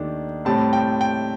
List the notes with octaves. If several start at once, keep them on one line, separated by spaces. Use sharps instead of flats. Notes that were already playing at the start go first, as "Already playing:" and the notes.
Already playing: D#2 D#3 A3 D4
A2 G3 C4 A5
G5
G5